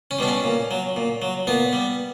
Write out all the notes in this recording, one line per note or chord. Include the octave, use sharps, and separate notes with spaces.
C#4
B2 G3 D4
C#4
A#2
F#3
A#2
F#3
A#2 B3
G3